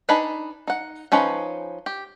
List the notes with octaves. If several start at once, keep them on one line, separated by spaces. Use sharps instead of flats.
D4 D#4 B4 G#5 B5
D#4 F#5
F3 C#4 D#4 B4
G4